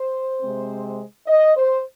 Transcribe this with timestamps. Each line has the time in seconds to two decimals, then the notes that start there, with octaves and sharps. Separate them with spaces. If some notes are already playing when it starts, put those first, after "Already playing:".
Already playing: C5
0.41 C3 G#3 C4
1.27 D#5
1.56 C5